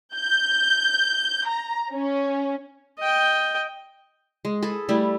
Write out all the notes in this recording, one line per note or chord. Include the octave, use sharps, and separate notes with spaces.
G6
A#5
C#4
D#5 G5
G#3
G#4 A4 B4
G3 A3 E4